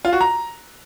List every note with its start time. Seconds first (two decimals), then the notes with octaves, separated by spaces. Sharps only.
0.05 F4
0.13 F#4
0.21 A#5